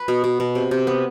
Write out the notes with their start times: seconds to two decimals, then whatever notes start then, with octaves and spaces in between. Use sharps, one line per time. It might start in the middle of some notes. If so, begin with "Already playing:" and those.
Already playing: B4
0.08 B2
0.24 B2
0.40 B2
0.55 C3
0.71 C3
0.87 B3